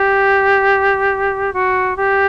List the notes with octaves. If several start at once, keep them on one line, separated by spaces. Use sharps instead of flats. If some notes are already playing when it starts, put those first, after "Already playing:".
Already playing: G4
F#4
G4